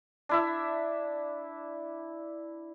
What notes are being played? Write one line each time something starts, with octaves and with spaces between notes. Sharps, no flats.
D4 E4 E5